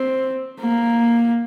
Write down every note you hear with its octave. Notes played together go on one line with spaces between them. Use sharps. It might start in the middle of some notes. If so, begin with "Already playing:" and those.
Already playing: C4
A#3